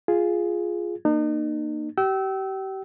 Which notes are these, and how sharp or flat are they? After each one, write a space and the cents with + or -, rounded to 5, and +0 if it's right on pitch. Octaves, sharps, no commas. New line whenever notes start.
F4 +0 G#4 +0
A#3 -5 D#4 -40
G4 -35 G5 -35 E6 -20